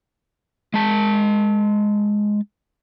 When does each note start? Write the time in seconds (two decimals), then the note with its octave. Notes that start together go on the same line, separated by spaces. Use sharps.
0.74 G#3 A5